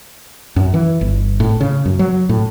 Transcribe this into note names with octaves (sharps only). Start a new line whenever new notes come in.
F#2
E3
G1
A2
C#3
F#2
F#3
A2